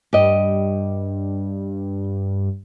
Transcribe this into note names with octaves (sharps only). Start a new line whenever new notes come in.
G2 G4 D#5